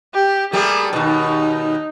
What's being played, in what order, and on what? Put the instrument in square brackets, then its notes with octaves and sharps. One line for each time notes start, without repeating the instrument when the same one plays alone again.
[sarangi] G4
[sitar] G3 A3 A#3 [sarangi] G#4
[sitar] D#2 B2 [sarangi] D#4